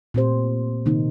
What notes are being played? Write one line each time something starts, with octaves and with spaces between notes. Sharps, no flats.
A#2 A3 C4 G4 C5
C3 D#3 A#3 D#4